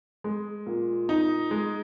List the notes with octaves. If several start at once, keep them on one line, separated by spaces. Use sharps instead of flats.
G#3
A#2
D#4
G#3